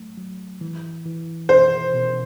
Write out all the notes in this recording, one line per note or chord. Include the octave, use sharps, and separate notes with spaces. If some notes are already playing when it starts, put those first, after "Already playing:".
Already playing: F#3 A3
F#3
E3
E3
B2 C5
B2